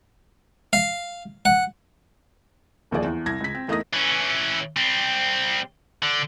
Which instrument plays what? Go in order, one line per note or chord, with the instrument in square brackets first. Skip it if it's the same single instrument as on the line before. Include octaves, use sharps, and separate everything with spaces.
[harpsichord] F5
F#5
[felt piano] D#1 D#2 F3 G#4 D5
E2
C2 G#6 A#6
C#2 B6
C4
E2 A3 D#4 A#4 D#6 A#6
[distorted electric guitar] E3 C#4
G3 C4
D3